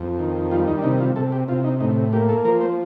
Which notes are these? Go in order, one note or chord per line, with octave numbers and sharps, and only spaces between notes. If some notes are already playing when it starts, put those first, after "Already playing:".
Already playing: F2
D#3
G3 F4
D#4
D4
C3 D#4
F4
C3 A4
G4
C3 F4
D#4
A2 D#4
A#3 G4
A4
F3 A#4
C5